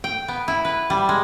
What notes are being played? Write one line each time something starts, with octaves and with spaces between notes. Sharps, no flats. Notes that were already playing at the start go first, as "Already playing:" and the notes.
G5
B3
E4
B4
G3
G#3